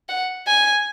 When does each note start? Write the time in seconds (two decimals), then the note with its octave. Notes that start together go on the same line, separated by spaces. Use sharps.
0.09 F#5
0.47 G#5